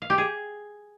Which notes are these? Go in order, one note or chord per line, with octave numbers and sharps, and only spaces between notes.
F5
G4
G#4